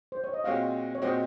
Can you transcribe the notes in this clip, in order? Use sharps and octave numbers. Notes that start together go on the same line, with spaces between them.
C5
C#5
D#5
A#2 G#3 C4 F#4 C#5 F5
C#5
A#2 G#3 C4 F#4 C5 D#5